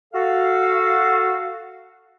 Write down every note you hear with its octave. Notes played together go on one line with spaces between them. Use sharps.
F#4 A4 F5